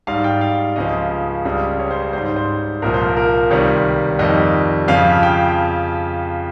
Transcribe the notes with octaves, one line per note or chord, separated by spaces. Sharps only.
G#2 G3 F5
G5
F5
C#2 C#3 F3 D#5
C#2 C#3 G3
C#5
C5
C5
G#2 G3 C5
C5
C5
C2 A#2 F3 A#4
C5
A#4
A#4
C#2 C3 D#3 G3 C#5
F2 D#3 G3 D#5
F2 C#3 F3 F5
G5